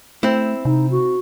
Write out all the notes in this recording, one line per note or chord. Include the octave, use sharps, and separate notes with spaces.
A3 C4 E4
C3 D#4
F#4